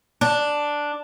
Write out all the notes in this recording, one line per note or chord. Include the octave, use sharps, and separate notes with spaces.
D4